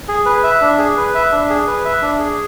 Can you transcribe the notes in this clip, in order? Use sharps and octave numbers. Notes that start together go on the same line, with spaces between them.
G#4
B4
E5
D4
G#4
B4
E5
D4
G#4
B4
E5
D4
G#4